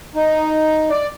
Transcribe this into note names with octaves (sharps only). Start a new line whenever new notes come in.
D#4
D5